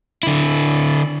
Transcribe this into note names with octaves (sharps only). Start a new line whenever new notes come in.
D3 E4